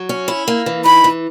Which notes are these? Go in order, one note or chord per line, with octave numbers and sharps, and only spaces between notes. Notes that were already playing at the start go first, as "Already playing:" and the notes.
Already playing: F#3
C#4
E4
A#3
E3
D#4 B5
E3